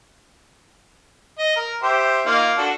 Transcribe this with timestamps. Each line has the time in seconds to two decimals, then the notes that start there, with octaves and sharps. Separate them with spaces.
1.39 D#5
1.56 A#4
1.83 G4 C5 E5
2.26 A#3 D#4 F4
2.57 D4 F#4 A4